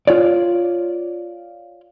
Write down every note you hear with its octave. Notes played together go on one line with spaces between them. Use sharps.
F4 C#5 D5